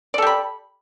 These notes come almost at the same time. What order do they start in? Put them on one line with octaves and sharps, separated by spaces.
D5 A4 G4 B5